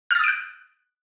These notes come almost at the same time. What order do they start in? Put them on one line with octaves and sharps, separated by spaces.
F6 A6 D#6 D7 F#6